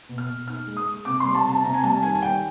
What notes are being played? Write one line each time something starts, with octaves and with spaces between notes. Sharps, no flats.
B2
F6
B2
D#4 F6
G#3
D#6
G#3
C3 D6
G3 C6
A5
C3 A5
C3 A#5
G#5
G3 A5
D#3 G#5
G#5
G3 G5